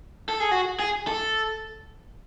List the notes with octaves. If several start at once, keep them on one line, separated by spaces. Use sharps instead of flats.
A4
G#4
F#4
G#4
A4